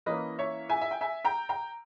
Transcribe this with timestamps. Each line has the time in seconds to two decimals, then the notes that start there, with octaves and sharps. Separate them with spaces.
0.06 E3 A#3 C#4 B4 D#5
0.38 C#5 E5
0.69 E5 G#5
0.81 E5
0.91 G5
1.01 E5 G#5
1.24 G5 A#5
1.49 G5 A#5